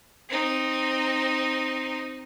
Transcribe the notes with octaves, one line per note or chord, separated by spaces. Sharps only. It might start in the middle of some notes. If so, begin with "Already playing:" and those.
C4 D#4